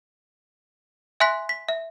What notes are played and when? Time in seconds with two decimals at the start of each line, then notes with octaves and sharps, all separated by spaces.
1.20 E5 G#5 C6 F#6 B6
1.49 B6
1.69 E5